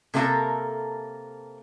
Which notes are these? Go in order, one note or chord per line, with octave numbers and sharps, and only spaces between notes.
C3 A3 A#3 E4 A4 A#4